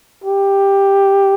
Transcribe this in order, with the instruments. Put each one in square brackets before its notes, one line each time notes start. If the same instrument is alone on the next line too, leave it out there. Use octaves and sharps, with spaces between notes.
[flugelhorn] G4